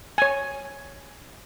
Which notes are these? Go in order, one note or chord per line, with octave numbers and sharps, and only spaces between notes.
C#5 G#5